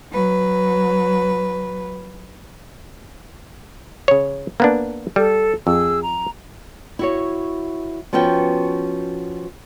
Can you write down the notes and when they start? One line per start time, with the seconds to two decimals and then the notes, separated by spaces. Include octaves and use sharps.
0.10 F#3 B4
4.08 C#3 C#5
4.60 A#3 B3 D4
5.16 G3 A4
5.67 F2 G#4 E6
6.01 A#5
6.99 E4 F#4 C#5
8.13 F3 B3 C#4 F#4 G5